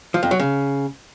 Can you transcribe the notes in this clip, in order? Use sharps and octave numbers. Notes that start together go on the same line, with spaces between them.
F3
F2
F#3
C#3